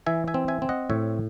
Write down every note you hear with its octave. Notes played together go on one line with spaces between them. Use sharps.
E3 E5 G#5
E5 G#5
C4
E5 G#5
C4
D#5 F#5
A2 C#5 E5